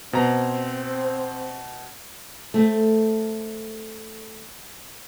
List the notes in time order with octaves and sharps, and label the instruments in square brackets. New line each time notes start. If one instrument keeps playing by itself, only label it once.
[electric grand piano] B2 A#5 [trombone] C4 [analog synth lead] C5
[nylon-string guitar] A3 C4